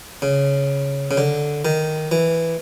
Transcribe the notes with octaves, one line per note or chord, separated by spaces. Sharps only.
C#3
C#3
D3
D#3
E3